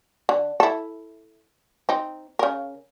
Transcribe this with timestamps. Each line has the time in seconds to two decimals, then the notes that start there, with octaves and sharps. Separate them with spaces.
0.29 D3
0.60 E4 A4
1.89 C4 D#4
2.39 C#3 A#4